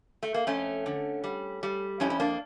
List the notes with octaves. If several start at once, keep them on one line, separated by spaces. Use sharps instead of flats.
A3
A#3
F2 A3 C#4
D3
G3
G3
F2 C#4 E4
C#4
A#3 D4